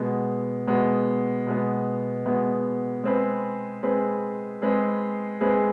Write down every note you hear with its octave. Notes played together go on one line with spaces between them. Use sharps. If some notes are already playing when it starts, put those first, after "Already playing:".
Already playing: B2 G#3 B3
B2 G#3 B3
B2 G#3 B3
B2 G#3 B3
G#3 C4 G#4 B4
G#3 C4 G#4 B4
G#3 C4 G#4 B4
G#3 C4 G#4 B4